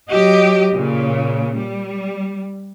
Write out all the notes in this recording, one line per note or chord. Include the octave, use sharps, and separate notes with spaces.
F#3 G4 D#5
A#2 C#3
G3